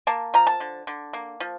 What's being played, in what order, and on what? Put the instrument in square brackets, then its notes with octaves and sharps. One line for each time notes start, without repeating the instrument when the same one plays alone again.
[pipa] A#3 A5
F3 A#5
A5
D3
D3
A#3
F3